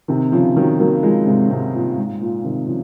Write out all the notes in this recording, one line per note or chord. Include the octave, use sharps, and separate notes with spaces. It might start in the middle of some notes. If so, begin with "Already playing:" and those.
C3 D#3
C#3 F3
D#3 F#3
F#3 A#3
F3 G#3
G#2 C3
G#2 C3
A#2
G#2
A#2
C3 D#3
C#3 F3